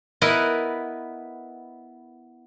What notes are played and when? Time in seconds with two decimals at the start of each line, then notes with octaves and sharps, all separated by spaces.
0.22 B3 E4 A#4 B4 D#5 F#5